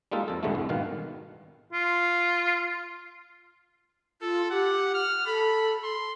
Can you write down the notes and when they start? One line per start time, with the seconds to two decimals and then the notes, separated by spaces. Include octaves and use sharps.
0.12 G3 G#3 A#3 D#4 F4 A4
0.28 F2 A4
0.43 C2 G2 D3 E3 G#3 A3
0.55 C2
0.69 G#1 B2 D#3 F5
1.73 F4
4.22 F4 A4
4.50 G4 F#5
4.94 F6
5.26 A4 B5
5.84 C6